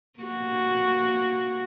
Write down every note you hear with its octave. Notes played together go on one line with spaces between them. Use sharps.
A#3 F#4